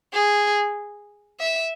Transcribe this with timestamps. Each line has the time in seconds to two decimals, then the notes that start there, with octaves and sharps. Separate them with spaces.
0.13 G#4
1.41 E5